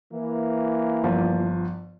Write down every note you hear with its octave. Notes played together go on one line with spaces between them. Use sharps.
E3 A#3
G1 F3